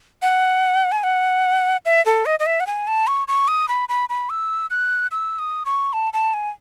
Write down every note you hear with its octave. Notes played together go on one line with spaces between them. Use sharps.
F#5
G#5
F#5
E5
A4
D#5
D#5
E5
F#5
G#5
A5
C#6
C#6
D#6
B5
B5
B5
E6
F#6
E6
D#6
C#6
A5
A5
G#5